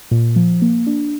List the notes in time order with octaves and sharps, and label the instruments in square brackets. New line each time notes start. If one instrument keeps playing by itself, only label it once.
[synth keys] A#2
F3
A#3
D4